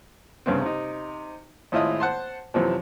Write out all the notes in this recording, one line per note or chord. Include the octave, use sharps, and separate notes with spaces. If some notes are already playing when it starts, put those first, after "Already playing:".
C2 G2 C#3 B3 C4
C3 D#4
G#1 A2 E4 F4 D#5 D#6
C5 F#5 A5 C6
F#2 C3 E3 F3